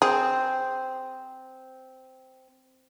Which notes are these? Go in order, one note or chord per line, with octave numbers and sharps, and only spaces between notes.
C4 G#4